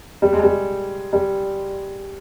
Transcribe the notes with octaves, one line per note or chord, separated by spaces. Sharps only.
G3
G#3
G3
G3